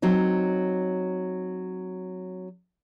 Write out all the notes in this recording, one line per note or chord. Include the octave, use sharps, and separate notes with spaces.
F#3 C4 D#4